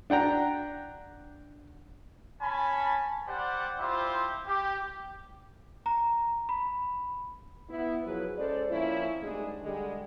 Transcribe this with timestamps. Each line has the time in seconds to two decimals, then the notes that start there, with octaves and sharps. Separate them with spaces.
0.10 D4 F#5 G5 A#5
2.41 C#4 G#5 A5 B5
3.27 G3 G4 C5 D5 F#5
3.79 C4 E4 F4 G4 C5
4.46 G4
5.86 A#5
6.49 B5
7.69 B3 E4
8.05 F3 F#3 G#4 B4
8.37 G#3 C#4 A4 C5 D5
8.71 F3 A#3 C4 C#4 E4
9.22 D2 G#2 G3 G#3 D4 G#4
9.63 D3 G3 G#3